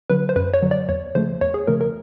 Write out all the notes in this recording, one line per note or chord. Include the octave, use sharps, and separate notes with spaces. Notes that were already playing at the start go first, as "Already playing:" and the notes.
D3 F#3 B4
C5
F#2 B4
C#5
D3 F#3
D5
E2 C#5
C#3 F3 A3 C5
E2 C#5
G#4
C#3 F3 A3 A#4
A#4